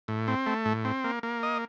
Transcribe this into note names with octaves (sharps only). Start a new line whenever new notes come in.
A2
C4
A3
A2
C4
A#3
A#3
D#5